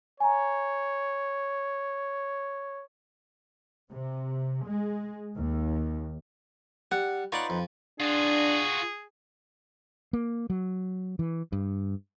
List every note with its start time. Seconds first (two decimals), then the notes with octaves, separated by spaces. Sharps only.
0.20 C#5 G#5 A#5
3.90 C3
4.65 G#3
5.37 D#2
6.91 G3 F#5
7.32 D#4 F4 B4 C#5 D5 F#5
7.50 F2
8.00 D4 F4 F#4 G#4
10.13 A#3
10.50 F#3
11.19 E3
11.52 G2